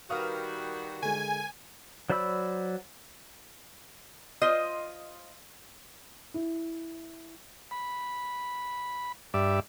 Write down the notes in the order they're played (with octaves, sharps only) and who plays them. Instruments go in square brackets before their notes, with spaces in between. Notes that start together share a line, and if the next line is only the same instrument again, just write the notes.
[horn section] D#3 G3 F#4 [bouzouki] A#4 B4 F5 [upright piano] D#6
[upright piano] D3 G#3 [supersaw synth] G#5
[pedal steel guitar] F#3 C5 D5 B5 E6
[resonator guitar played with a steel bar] F4 C5 D#5
[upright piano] E4
[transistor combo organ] B5
G2 D5 E5